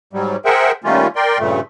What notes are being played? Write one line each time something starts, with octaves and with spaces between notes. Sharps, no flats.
G#2 F#3 G3
G#4 A#4 C5 E5 F#5 G5
D#3 G3 A3 A#3 C#4 F4
A#4 D5 G5 C6
G2 A#2 C#3 A3